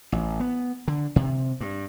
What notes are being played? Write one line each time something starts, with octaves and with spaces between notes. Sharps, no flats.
A1
B3
D3
C3
G2